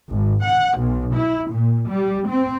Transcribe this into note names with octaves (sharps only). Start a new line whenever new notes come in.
G#1
F#5
B1
E4
A#2
G3
C4